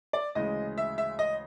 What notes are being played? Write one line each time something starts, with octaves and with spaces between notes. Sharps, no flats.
D5
D2 C#3 E3 G#3 D#5
E5
E5
D#5